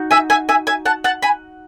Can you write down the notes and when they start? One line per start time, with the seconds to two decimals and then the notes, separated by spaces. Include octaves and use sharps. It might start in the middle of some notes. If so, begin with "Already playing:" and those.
Already playing: D#4 F#4
0.11 E5 G#5
0.30 E5 G#5
0.49 E5 G#5
0.67 E5 G#5
0.85 F#5 A5
1.04 F#5 A5
1.22 G#5 B5